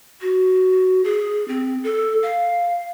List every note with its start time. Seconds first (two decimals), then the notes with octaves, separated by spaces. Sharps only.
0.22 F#4
1.04 G#4
1.48 C4
1.84 A4
2.23 F5